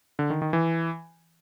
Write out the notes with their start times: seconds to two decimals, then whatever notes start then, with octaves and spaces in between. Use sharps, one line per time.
0.19 D3
0.30 D#3
0.42 D#3
0.53 E3